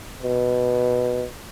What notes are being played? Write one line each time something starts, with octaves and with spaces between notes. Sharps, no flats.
B2